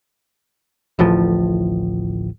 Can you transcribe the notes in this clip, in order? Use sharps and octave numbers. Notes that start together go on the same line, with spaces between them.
D1 A1 A2 F3